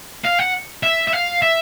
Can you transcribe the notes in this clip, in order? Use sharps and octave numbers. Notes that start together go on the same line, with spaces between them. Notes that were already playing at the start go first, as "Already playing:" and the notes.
F5
F#5
E5
E5
F5
E5